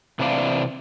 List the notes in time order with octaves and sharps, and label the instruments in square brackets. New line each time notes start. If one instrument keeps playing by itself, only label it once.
[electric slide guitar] C3 E3 D4 D5 F5